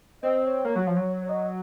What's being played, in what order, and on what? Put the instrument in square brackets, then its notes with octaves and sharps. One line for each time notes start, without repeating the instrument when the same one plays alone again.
[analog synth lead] C4 [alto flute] D#5
[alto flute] C#5
[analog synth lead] A#3
F#3
F3
F#3
[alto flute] C#5
D#5